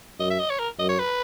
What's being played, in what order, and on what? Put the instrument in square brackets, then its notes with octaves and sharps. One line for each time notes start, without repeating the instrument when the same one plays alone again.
[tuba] F#2 [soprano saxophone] D#5
[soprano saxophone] E5
D#5
C#5
A#4
[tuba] F#2 [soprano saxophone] D#5
[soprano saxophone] C#5
B4